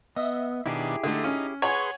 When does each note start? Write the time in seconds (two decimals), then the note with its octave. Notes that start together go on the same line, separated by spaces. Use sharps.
0.16 B3 D#5 E5
0.66 B2 D#3 D4 E4 G4 G#4
1.04 D3 A3 D#4
1.24 C#4
1.62 G#4 B4 C#5 F#5 G#5 C6 C#6 G#6